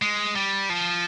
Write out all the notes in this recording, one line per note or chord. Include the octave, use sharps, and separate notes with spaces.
G#3
G3
F3